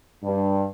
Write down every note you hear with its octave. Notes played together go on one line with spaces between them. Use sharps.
G2